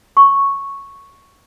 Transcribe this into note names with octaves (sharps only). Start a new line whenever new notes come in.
C#6